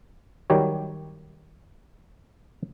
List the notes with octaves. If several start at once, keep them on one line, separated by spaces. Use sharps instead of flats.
D#3 F#3 G3 G4 C#5